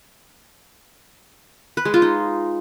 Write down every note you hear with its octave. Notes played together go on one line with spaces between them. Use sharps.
B4
G#3
F4
D#4